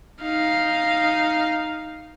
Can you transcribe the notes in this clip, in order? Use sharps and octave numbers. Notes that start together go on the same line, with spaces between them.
D#4 F5